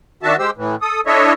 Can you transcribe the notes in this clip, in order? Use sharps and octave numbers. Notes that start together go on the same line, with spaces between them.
D#3 D4 F#4 E5 A5
G#3 G4 C5 E6
A2 E3
A4 D#6
D4 E4 A4 C#5 D#5 E5